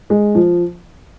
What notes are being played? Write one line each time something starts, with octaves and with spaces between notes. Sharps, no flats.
G#3
F3